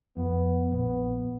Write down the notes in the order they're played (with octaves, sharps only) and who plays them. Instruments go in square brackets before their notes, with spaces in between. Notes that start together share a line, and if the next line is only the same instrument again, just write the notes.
[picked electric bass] F2 [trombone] B3
[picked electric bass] A#1 [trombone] B3